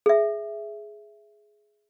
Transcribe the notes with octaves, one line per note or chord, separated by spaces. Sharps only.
G#4 E5